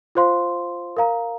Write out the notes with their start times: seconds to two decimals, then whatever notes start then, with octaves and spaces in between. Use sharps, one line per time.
0.15 F4 C5 F5 C6
0.97 A#4 F5 A#5